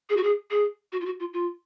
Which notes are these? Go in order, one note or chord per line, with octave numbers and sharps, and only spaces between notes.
G#4
F#4
G#4
G#4
F#4
F4
F#4
F4
F4